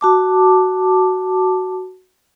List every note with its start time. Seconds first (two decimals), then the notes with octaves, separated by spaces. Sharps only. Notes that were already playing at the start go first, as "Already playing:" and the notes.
0.01 F#4 A5 D6